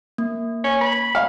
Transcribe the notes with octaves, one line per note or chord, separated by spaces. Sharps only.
A#3
C#4
B5
F5